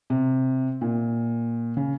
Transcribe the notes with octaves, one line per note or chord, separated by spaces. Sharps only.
C3
A#2
C#3